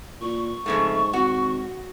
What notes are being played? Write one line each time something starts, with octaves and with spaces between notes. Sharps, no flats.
A#2 C#6
F2 G#2 C#3 A3
G#1 F#4